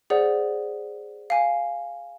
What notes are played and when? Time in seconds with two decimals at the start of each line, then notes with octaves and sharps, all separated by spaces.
0.10 G#4 C5 D5 F#5
1.30 F5 G#5